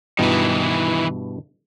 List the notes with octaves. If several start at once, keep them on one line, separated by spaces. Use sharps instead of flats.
G2 B2 D#3 E3 E4